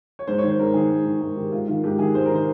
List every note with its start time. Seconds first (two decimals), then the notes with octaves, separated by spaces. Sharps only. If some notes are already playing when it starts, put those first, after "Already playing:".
0.19 C#5
0.27 G#2 C5
0.38 C#5
0.43 D#3
0.49 C5
0.59 G#2 A#4
0.74 D#3 G#4
0.90 G#2 A#4
1.06 D#3
1.21 G#2 G#4
1.36 D#3 G4
1.52 G#2 F4
1.68 D#3 F4
1.84 G#2 G4
1.99 D#3 G#4
2.14 G#2 C5
2.25 A#4
2.30 D#3
2.35 C5